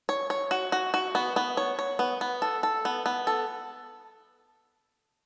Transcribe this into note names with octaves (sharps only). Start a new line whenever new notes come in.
C#5
C#5
F#4
F#4
F#4
B3
B3
C#5
C#5
B3
B3
A4
A4
B3
B3
A4